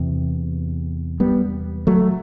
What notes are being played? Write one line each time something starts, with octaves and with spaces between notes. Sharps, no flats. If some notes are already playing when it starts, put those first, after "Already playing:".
Already playing: E2 C3
G3 B3
F#3 A3